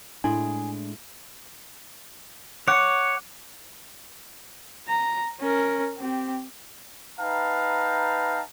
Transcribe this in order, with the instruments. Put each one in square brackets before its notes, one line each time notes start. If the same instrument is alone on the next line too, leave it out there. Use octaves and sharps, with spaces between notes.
[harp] A2 G#3 [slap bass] D4 [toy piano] E4 C6 [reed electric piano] G#5
[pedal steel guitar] C#5 F#5 [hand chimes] D6
[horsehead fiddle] A#5
C#4 A#4
C4 G4
[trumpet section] D#4 B4 F5 G5 A5 A#5